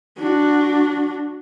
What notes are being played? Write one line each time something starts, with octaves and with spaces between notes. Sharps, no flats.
D4 F#4